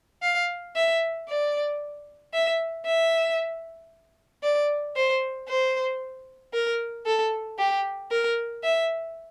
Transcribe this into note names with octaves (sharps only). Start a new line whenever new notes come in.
F5
E5
D5
E5
E5
D5
C5
C5
A#4
A4
G4
A#4
E5